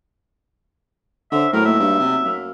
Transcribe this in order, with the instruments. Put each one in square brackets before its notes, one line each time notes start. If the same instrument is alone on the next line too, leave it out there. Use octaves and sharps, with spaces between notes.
[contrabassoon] D3 [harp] C#4 C5 C6 [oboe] E5
[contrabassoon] A2 [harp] F#3 A3 B3 [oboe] A#4
[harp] A#3 B3 D#4 [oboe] E5
[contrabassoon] G2
C3
[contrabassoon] F#2 [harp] F5 D6 E6